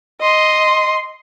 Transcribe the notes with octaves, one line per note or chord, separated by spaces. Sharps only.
D#5 C6